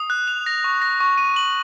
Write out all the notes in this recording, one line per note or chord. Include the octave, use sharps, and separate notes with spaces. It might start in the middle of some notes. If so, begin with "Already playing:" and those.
Already playing: D#6
F#6
F7
A#6
C#6
A#6
C#6
D#7
F#7